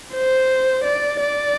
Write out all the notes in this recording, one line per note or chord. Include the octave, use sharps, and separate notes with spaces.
C5
D5
D5